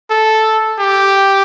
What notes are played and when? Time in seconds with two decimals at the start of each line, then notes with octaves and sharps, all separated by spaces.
0.11 A4
0.79 G4